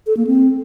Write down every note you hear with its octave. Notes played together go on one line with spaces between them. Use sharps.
A4
A#3
C4